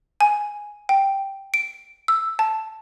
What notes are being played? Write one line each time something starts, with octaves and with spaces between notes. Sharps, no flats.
G#5
G5
D7
E6
A5